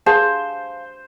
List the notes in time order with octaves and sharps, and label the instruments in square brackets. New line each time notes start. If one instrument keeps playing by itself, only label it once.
[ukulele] G#4 F5 A5 [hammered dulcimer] C5